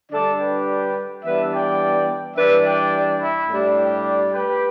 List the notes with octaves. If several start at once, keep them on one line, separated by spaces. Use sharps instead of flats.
D3 G3 D4 A4 D5
G4 B4
E3 G3 B3 D4 B4 E5
D5 G5
E3 G3 D4 B4 E5
D5 G5
E4
A2 G3 D4
G4
G4 B4